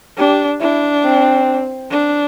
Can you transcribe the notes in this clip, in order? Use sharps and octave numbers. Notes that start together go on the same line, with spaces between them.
D4 G4
D4 E4
C4
D4